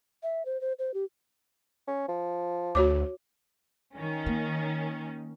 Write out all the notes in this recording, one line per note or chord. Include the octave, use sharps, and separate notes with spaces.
E5
C5
C5
C5
G4
C#4
F3
D2 F#4 C#5 D6
D#3 C#4
A#3